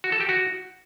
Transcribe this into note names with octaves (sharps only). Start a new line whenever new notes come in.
F#4
A4
G4
F#4